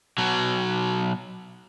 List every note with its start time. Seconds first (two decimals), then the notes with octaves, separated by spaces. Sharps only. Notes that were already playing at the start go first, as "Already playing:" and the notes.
0.18 B2 F#3